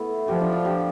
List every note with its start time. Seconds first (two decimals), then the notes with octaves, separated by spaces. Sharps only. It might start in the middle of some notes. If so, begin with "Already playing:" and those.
Already playing: A3 B3 E4
0.28 F3 G4
0.41 D4
0.53 F4
0.65 G4